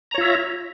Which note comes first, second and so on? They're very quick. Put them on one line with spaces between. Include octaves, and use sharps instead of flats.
A#5 C#5 F4 E5